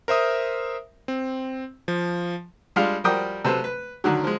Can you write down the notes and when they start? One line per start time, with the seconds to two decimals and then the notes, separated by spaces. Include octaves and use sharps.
0.08 A#4 C5 E5 D#6
1.08 C4
1.88 F3
2.76 G3 G#3 D4 F4 F5
3.04 F3 G3 F#4 A#4 G5 D#6
3.45 C3 F#3 A4 B4 C5
3.64 B4
4.04 D3 D#3 F#3
4.24 F3 G#3